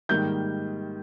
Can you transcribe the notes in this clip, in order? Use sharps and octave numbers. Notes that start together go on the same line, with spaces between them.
G#2 D#3 G3 A#3 G6